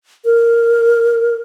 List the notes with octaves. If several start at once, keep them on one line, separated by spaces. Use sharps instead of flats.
A#4